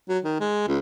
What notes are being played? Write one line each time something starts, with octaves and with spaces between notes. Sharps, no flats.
F#3
D#3
G#3
C#2